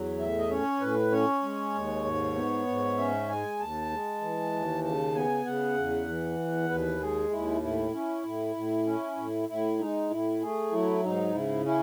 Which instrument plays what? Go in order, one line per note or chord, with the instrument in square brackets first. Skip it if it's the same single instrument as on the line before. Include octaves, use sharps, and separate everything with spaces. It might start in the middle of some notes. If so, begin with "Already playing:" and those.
Already playing: [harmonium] E2 F#3
A2 E5
D#5
C#4 C#5
A2 B4
C#4 C#5
G#3
D#2
G#2
B3
G#2
C#4 E5
G#3 G#5
D#2 A5
G#3
E3
D#2
C#3 A5
B3 G#5
C#3 F#5
E2
E3
E2
D#2 B4
G#3 G#4
D#2 E4
A2 E4
C#4
A2
A2
C#4
A2
A2 E4
G#3 D#4
A2 E4
A3 G#4
F#3 E4
G#2 D#4
C#3 E4
C#4 E4